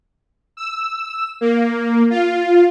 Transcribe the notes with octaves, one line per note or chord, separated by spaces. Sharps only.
E6
A#3
F4